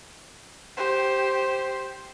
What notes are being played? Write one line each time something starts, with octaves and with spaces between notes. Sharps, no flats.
G4 C5